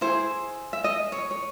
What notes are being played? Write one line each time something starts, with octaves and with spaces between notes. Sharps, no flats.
E4 G#4 C5
E5
D#5
C#5
C#5